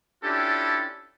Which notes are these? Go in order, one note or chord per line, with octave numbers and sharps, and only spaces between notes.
C#4 D4 E4 F4 G4 A4